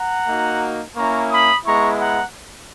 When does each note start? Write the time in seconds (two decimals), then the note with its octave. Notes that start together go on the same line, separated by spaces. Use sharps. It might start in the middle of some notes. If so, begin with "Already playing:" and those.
Already playing: F#5 A#5
0.28 A#3 D#4 F#4
0.96 A#3 C#4 E4 A#5 C#6
1.31 B5 D#6
1.65 G#3 B3 E4 A#5 C#6
1.99 F#5 A#5